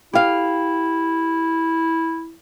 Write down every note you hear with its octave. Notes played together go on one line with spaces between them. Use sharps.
E4 G4 F5